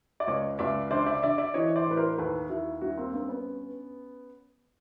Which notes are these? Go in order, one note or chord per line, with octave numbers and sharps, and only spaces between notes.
D5
C#2 C#5 D#5
C#2 D5 E5
D3 C5 D5
D5 E5
D3 D5 E5
D5 E5
E3 C#5 D#5
C5 D5
A2 B4
A#4 C5
D#2 A4 B4
D#2 E4 F#4
G2 E4 F#4
A#3 C4
G2 A#3 C4
B3 C#4